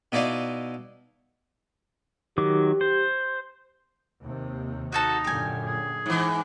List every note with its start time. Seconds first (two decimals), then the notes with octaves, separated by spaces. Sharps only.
0.12 B2 D#4 E4 D5 F5
2.38 D#3 F#3 G4 D6
2.81 C5
4.22 D#2 C3
4.92 D#4 F#4 A4 A5
5.24 F#2 A#2 D3 G4 G#5
5.66 G#4
6.06 G#2 E3